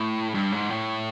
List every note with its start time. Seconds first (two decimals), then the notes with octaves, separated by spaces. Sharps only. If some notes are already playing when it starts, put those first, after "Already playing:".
Already playing: A2
0.34 G2
0.52 G#2
0.69 A2